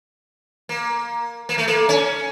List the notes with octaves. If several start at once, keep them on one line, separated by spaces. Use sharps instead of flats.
A#3
A#3
A3
A#3
C#4